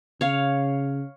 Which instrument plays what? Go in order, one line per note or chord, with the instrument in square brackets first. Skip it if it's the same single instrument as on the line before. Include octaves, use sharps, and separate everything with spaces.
[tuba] C#3 [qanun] C#5 F5